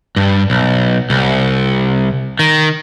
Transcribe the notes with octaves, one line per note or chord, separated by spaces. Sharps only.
G2
B1
C2
D#3